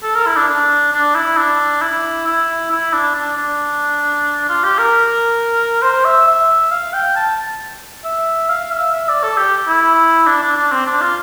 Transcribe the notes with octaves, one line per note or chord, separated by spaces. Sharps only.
A4
A#4
E4
D4
D4
D4
E4
D4
E4
E4
E4
D4
D4
D4
F4
G4
A#4
C5
E5
E5
F5
G5
A5
E5
F5
E5
E5
D5
A4
G4
E4
D4
D4
D4
C4
D4
F4